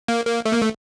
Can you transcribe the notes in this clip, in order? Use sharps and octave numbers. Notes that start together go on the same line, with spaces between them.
A#3
A#3
A3
A#3
A3